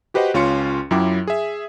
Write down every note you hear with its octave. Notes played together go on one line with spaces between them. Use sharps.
F#4 G4 B4 C5 D#5 F#5
C#2 C#4 F4 C6 C#7
F#2 F#3 E4 F4 G5 D6
G#4 E5